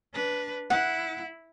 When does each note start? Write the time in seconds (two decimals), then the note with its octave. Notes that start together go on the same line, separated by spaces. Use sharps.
0.14 D4 B4
0.70 E4 F#5